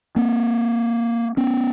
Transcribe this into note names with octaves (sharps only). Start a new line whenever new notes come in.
A#3 C4
B3 C#4